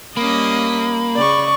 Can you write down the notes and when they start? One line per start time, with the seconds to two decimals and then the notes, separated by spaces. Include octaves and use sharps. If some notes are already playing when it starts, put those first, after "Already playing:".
0.17 G3 A#3 C#4 D#5 B5
1.16 C#3 G#4 D5 C#6